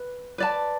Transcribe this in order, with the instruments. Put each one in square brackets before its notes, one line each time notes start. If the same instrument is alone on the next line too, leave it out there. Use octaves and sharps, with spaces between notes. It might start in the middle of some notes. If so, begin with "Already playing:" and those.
Already playing: [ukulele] B4
B4 D5 A5